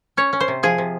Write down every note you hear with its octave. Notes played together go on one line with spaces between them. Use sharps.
C#4 C#5
C#4
C5
C3
F3 G#4
C3